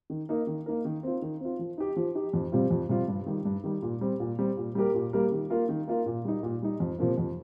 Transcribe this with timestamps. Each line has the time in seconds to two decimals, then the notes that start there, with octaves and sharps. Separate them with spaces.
0.10 D#3
0.29 A#3 D#4 A#4
0.47 D#3
0.66 A#3 D#4 A#4
0.85 D#3
1.03 C4 F4
1.22 D#3
1.41 C4 F4
1.59 F3
1.78 D#4 G4
1.96 F3
2.15 D#4 G4
2.33 F2
2.52 C3 G3 C4 F4
2.71 F2
2.89 C3 G3 C4 F4
3.08 G2
3.26 D#3 G3
3.45 G2
3.64 D#3 G3
3.82 A#2
4.01 G3 C4
4.20 A#2
4.39 G3 C4
4.57 A#2
4.75 G3 A#3 G4 A#4
4.94 A#2
5.13 G3 A#3 G4 A#4
5.32 D#3
5.50 A#3 F4 A#4
5.69 D#3
5.88 A#3 F4 A#4
6.06 A#2
6.25 G3 D#4
6.43 A#2
6.62 G3 D#4
6.80 F2
6.99 C3 F3 A#3
7.18 F2